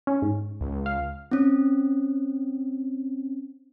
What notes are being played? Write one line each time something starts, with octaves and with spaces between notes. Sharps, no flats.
C#4
G#2
C#2
F5
C4 C#4